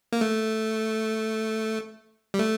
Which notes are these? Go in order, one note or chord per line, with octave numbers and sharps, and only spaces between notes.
A#3
A3
G3
A3